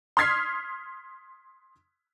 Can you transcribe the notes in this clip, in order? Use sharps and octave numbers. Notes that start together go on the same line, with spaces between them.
C6 D#6 F6 G#6 B6 C7